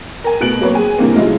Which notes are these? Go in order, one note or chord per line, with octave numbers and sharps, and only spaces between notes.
A#4 G#5
B2 A3 B3 F#6 D7 F#7
F#3 A#3 C4 B4 C#5
G#4 G#5
G2 C3 E3 A#3 C4
C#3 F#3 G#3 A3 E4 F4